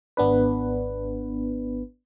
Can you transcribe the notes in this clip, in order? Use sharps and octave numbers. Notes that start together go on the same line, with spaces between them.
G#1 B3 D4 B4